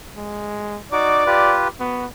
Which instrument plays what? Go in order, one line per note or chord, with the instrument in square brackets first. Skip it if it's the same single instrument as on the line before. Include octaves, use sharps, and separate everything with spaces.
[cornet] G#3
[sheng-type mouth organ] D#4 F#4 D6 [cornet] D5
[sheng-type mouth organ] F4 G4 B4
[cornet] B3 [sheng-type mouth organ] F#4